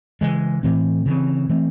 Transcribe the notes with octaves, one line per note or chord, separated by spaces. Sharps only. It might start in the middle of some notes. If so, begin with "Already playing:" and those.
C#3 E3 G#3
A2 E3 A3 C4
C#3 E3 C4
E3 A3 C4